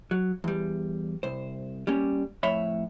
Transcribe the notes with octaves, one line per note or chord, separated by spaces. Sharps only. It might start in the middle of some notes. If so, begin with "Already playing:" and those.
F#3
E2 G3
C2 C5
G3 A#3 C#4
F2 A2 C#5 E5 B5